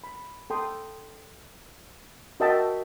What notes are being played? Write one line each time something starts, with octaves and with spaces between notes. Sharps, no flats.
B5
A4 G5 C6 D#6
F#4 A#4 D#5 E5 G5 A5